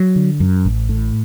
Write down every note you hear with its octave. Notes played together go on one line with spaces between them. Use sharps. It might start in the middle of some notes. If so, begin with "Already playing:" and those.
Already playing: F#3
D3
F#2
A1
A2